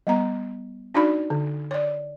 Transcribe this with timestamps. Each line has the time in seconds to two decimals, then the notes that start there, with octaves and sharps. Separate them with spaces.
0.07 G3 B3 A#5
0.94 D4 D#4 F#4 D5 B5
1.30 D3
1.71 C#5 D5